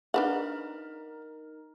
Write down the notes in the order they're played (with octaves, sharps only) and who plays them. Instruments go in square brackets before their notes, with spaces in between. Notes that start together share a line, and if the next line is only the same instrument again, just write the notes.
[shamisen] D4 B4 F#5 [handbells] D#4 A#4